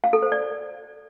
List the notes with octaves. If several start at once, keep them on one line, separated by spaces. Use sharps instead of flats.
F5
A4
C5
D5